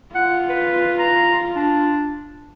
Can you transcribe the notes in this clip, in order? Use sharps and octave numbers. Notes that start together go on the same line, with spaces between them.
F4 F#5
B4
A#5
D4